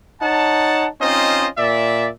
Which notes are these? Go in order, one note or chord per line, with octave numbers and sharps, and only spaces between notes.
D#4 C#5 F#5 A5
C4 C#4 D#4 F4 C5 D#5
A#2 D5 E5